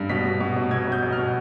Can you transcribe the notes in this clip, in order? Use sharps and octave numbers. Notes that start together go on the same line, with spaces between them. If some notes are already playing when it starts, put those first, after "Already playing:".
Already playing: G2
B2 B6
B2
B2
B2
B2 G#6
B2 G6
B2
F6
B2